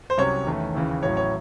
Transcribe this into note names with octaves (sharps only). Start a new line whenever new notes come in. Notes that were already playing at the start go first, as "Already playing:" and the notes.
C5
C2 C3 F#3 C#4 C#5
E2 D#3 A3 C#4
D#2 C#3 E3
A1 A2 F#3 C#5
C#5